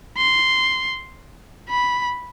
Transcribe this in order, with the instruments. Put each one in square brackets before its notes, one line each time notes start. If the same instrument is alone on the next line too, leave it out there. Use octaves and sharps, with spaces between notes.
[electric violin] C6
B5